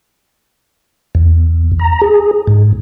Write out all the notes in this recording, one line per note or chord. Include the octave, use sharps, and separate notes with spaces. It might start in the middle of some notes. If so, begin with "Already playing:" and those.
E2
A#5
G#4
G#2